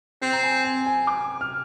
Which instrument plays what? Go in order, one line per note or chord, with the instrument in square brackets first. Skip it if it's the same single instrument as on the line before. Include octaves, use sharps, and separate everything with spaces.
[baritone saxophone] C4 [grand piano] G5
[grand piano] A#5
G#5
G#5
G#5
D6
F6